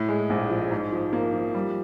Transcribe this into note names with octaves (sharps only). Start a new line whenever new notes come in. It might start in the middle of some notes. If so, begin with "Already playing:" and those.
Already playing: A2
G#3
A#1
F3
G#2
F3
A#3
F3
G3